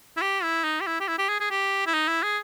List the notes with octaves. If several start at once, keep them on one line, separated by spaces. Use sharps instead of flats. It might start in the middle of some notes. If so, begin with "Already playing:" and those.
E4
G4
E4
D#4
G4
E4
G4
E4
G4
G#4
G#4
G4
E4
D#4
E4
G#4